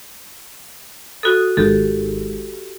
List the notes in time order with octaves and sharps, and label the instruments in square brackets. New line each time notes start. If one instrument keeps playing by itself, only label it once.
[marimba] F#4 A4 [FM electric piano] D#6
[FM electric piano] G#1 D#3 G#3 [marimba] G4 A4